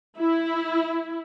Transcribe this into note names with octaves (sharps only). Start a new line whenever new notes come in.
E4